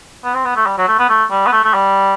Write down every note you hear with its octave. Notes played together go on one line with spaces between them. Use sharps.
B3
C4
B3
A3
G3
F#3
A3
B3
A3
G3
B3
A3
A3
G3